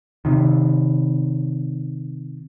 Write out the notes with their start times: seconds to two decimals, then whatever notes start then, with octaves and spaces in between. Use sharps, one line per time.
0.25 C3 D#3